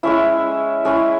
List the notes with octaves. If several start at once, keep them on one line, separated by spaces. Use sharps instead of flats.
G#3 C#4 E4 E5
G#3 C#4 E4 G#5